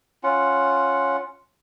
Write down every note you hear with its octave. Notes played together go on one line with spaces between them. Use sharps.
C#4 F4 F#5